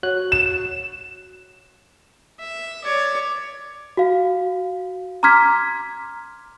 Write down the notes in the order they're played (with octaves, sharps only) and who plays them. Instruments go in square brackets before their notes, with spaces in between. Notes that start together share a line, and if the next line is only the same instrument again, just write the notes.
[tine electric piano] F#4 C#5 F#6
[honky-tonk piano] E7
[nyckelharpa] E5
C#5 D5
[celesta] F#4 F5
A#5 C6 D6 F6 G#6 B6